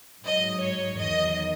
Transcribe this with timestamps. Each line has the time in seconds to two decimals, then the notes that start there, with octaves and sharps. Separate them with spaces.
0.23 G#2 F#3 D#5
0.61 C#5
0.98 E2 D#3 F#3 D#5